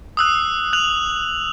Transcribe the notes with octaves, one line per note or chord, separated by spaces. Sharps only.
D#6 E6 F#6
F#6 F7 F#7